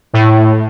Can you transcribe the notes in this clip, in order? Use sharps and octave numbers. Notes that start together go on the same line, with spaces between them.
A2